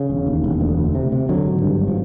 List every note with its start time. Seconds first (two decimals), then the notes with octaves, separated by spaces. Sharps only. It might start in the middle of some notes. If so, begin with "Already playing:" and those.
Already playing: C#3
0.10 E1
0.27 D#2
0.44 E1
0.61 D2
0.77 D2
0.95 C3
1.12 C3
1.29 D3 F#3
1.46 G#1
1.62 G2
1.80 G#1
1.88 F3